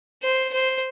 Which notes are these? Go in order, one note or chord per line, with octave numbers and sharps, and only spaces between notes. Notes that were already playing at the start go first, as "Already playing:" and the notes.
C5
C5